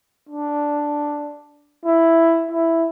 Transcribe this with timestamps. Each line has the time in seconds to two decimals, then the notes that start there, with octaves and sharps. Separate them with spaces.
0.29 D4
1.85 E4
2.51 E4